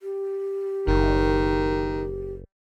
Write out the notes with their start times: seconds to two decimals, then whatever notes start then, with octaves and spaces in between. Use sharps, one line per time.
0.01 G4
0.87 F#1 D#3